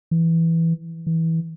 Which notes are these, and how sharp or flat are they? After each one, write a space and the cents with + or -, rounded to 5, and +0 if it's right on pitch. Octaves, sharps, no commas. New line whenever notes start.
E3 +0
E3 -20